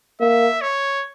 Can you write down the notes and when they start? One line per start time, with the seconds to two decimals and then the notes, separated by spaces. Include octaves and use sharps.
0.21 A#3 E5
0.61 C#5